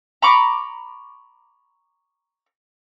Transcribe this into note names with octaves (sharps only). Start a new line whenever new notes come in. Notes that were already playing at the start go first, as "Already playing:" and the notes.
A#5 B5 C#6 D6